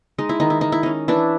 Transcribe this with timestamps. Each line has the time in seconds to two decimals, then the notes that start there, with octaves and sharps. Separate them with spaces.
0.18 G#3 D#4
0.29 E4
0.40 D#3 D#4
0.50 E4
0.61 D#3 D#4
0.72 E4
0.83 C#4 D#4
1.08 E3 D4 E4